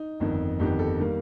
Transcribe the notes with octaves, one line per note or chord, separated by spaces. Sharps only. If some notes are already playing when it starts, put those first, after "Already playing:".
Already playing: D#4
G1 F2 D#3
G1 F2 D#3 G4
A4
D#3 G3 A#3